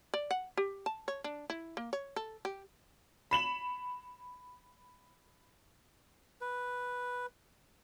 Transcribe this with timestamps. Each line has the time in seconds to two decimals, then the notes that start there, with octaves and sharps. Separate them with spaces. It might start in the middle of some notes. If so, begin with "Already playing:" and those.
0.14 D5
0.31 F#5
0.57 G4
0.86 A5
1.08 C#5
1.24 D4
1.50 E4
1.77 A#3
1.93 C#5
2.16 A4
2.45 G4
3.31 B5 E7 F#7
6.41 B4